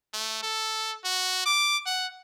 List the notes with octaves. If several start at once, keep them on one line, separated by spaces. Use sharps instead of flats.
A3
A4
F#4
D6
F#5